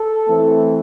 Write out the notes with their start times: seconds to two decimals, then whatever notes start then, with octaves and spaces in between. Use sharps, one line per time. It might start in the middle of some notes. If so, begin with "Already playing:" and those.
Already playing: A4
0.28 E3 A3 C4